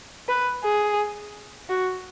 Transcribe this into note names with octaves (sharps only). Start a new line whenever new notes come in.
B4
G#4
F#4